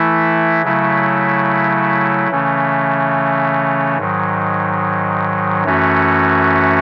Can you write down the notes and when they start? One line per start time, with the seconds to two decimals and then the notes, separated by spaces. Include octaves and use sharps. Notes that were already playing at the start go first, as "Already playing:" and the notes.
Already playing: E3 A3 E4
0.63 C#3 F#3 A3 E4
2.30 C#3 E3 A3 C#4
3.97 G#2 D#3 F#3
5.64 F#2 E3 A3 C#4 F#4